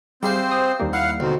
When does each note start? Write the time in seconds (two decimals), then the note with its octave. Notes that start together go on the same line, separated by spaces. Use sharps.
0.23 G3 C4 G4 G#4 C5 E5 F5
0.51 D#6
0.80 D#2 G3 A#3
0.93 E4 F5 F#5
1.20 D2 B2 D#3 C4